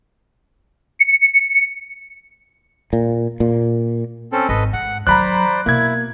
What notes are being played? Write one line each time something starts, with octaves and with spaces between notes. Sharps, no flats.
C#7
A#2
A#2
C4 C#4 A4
G#1 A4 B4 D#5
G#2 F#5
D#3 F#3 C5 D5 A#5 B5 F#6
B2 A#3 E4 G#6